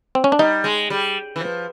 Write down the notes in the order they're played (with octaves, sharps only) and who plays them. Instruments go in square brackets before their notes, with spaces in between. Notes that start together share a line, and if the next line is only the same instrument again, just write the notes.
[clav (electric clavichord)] C4
C#4
D4
[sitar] G3 [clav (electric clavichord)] D#4
[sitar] G#3
G3
E3
F3